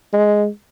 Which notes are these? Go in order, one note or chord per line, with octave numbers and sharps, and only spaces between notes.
G#3